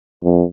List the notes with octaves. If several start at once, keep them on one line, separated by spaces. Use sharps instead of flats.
F2